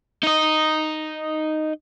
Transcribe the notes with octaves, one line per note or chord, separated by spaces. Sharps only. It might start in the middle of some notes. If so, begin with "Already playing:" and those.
D#4 D#5